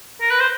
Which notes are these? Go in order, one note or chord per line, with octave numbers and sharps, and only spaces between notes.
A#4
B4
C5